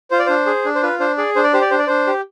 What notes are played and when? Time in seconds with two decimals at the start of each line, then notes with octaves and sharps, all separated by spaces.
0.11 F4 C5
0.19 D5
0.26 D4 C5
0.46 G#4
0.65 D4
0.75 C5
0.83 F4 B4
1.00 D4 C5
1.17 G#4 D5
1.36 D4 C5
1.44 D5
1.53 G4 C5
1.61 D5
1.71 D4 C5
1.79 D5
1.87 D4 C5
2.07 G4